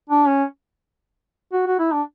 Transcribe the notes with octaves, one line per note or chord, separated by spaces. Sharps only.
D4
C#4
F#4
F#4
E4
D4